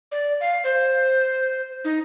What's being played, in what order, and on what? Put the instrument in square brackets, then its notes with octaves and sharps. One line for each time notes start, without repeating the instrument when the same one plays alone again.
[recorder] D5
F5
C5
D#4